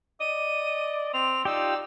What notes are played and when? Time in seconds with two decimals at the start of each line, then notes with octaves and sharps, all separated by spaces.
0.20 D5 D#5 D#7
1.14 C4 F7
1.45 D#4 F4 G4 D5 E6